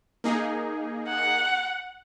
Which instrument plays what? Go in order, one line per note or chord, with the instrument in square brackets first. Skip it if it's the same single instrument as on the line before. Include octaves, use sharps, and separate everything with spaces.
[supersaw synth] A#3 D#4 G#4
[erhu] F#5